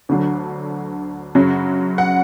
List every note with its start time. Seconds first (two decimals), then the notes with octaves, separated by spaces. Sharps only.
0.09 D2 D3 F#3
1.35 F#2 C#3 F#3
1.98 F#5